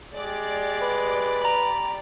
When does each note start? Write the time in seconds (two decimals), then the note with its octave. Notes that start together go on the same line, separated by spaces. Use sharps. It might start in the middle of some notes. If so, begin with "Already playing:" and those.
0.14 G#3 G4 D5
0.81 B4
1.42 A#5 B5